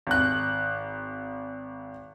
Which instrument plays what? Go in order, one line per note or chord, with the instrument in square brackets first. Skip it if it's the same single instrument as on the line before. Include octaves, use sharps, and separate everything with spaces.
[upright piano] G#1 F#6